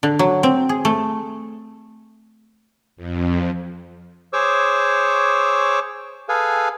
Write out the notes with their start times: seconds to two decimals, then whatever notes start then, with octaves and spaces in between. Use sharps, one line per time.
0.03 D3
0.19 F#3
0.43 C4
0.69 G#4
0.85 A3
2.96 F2
4.33 G#4 C5 C#5 C#6 D6 E6
6.29 G#4 A4 B4 F5 G#5